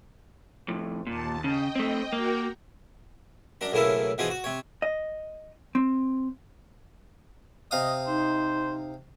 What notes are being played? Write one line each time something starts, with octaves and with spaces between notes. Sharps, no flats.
F2 A2
D#2 A#2 A5
C#3 D#5 G5
A3 C4
A#3 F#4 A#4 G5
F#2 D4 A#5
B1 A2 C#3 A#3 E4 A4
B2 E3 F3 D#4 G#4
F#4
C3 C#5
D#5
C4
C3 D#5 F5 D#6
D#4 C5